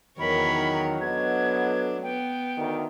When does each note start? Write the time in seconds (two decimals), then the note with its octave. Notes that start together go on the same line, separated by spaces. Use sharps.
0.19 E2 D#3 F#3 A#4 C#5 B5
1.01 B3 D4 A4 D#5 G#6
2.03 B3 G5
2.58 D2 D#3